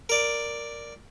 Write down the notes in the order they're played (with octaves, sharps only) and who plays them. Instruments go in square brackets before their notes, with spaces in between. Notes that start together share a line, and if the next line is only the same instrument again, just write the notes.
[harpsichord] A#4 D5